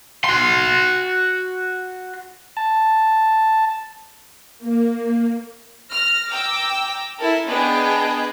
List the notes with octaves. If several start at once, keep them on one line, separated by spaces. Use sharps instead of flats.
F#4 C6
A5
A#3
F6 A#6
G5 A#5 D6 E6
E4 A4 A#4
B3 D4 G#4 D#5 G5